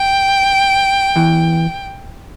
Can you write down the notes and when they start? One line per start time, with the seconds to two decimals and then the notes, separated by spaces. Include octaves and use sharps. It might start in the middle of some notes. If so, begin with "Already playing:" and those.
Already playing: G5
1.16 E2 E3